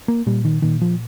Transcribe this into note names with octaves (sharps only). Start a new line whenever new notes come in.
A#3
A#2 G3
D#3
A#2 D#3
F3